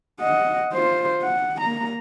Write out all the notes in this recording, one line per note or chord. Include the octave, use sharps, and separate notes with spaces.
D#5 F#5
F4 C5
F#5
A#3 A#5